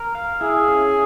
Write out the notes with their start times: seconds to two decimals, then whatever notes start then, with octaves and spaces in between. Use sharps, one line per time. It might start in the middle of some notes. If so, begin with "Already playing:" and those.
Already playing: A#4
0.15 F5
0.41 E4 G#4
0.68 C#4